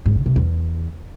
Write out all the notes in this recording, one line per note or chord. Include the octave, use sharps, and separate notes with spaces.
G#2
C#3
C3
E2